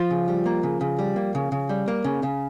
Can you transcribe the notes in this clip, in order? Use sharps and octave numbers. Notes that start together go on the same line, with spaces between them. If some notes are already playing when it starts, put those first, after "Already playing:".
Already playing: F3 F4
C#3
G3
A#3
C#3
C#3
G3
A#3
C#3
C#3
G3
A#3
C#3
C#3